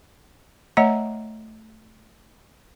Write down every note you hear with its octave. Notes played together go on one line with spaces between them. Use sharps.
A3 C#5 D#5 F#5 A#5